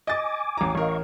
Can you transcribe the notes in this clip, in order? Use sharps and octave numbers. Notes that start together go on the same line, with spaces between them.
D#5 G#5 D6 A6
A1 A#5
A1 A#4 D#5 F5 C#6